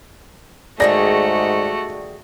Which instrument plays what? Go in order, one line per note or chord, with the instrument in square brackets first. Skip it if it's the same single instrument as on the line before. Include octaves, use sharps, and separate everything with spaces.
[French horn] G#2 [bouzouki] D#3 G3 G#4 [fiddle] A3 F#4 [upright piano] D5 A#6